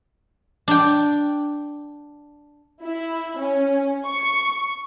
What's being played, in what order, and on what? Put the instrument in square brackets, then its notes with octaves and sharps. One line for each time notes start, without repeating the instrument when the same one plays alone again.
[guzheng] D4 G5
[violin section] E4
C#4
C#6